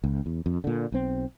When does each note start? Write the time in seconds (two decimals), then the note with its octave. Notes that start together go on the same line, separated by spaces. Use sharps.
0.04 C#2
0.26 E2
0.46 F2
0.64 A#2 D3
0.92 B1 C4